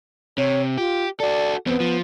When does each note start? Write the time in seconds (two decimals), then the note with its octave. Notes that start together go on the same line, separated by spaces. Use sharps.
0.38 C3 C#5
0.78 F4 G4
1.20 F#4 A4 D5
1.67 E2 B3 C4
1.80 F3